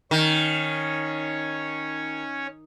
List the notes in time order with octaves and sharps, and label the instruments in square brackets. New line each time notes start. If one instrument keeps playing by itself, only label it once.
[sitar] D#3 [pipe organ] C#4 C#5